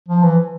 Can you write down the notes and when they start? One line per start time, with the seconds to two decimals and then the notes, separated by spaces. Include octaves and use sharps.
0.08 F3
0.23 E3